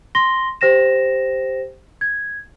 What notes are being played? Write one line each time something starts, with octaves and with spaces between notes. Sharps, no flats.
C6 A#6 G7
G4 C5 G5 A#6 E7
G#6